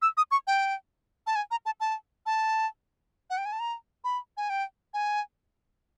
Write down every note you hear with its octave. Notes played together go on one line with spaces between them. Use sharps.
E6
D#6
C#6
G5
A5
G#5
A#5
A5
A5
A5
F#5
G5
G#5
A5
A#5
B5
G#5
G5
G#5